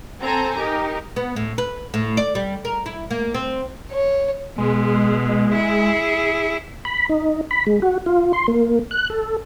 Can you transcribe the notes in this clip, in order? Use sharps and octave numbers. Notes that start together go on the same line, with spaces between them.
C4 A4 C5 G#5 A#5
D#4 G4 A#4
B3
A2
B4
A2
D5
G3
A#4
E4
A#3
C4
C#5
B2 G#3
E4 G#4
B5
D#4
B5
G#3
F#4
F4
C6
A#3
F#6
A4